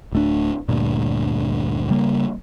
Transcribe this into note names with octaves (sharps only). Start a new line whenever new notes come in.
D1 A3 D4
D2 G2 A#2
C#3 G3 A#3